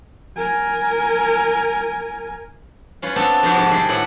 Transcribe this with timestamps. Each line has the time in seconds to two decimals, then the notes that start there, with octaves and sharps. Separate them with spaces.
0.37 A#4 G#5
3.02 C#4 F4 B4 C#5
3.16 B3 C4 D4 A4
3.43 F2 D4 F#4 B4 C5 D5
3.55 G#2 C3 F3
3.69 D#3 G3 D4 G#4
3.89 A2 D4 B4 E5 F#5